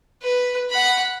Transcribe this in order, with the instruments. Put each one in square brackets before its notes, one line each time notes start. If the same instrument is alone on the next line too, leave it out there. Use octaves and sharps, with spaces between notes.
[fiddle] B4
F#5 B5